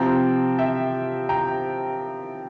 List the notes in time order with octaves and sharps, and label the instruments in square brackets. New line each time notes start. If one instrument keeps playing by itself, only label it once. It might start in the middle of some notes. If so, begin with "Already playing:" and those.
Already playing: [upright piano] C3 F3 C4 G5 A#5
E5 G5
G5 A#5